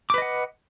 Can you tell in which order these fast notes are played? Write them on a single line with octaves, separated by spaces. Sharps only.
D6 B4 D#5 F#5